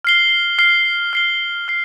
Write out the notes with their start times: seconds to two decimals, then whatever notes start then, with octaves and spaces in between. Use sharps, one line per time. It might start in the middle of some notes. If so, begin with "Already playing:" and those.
0.05 F6 C7 G7
0.58 F6 C7 G7
1.13 F6 C7 G7
1.68 F6 C7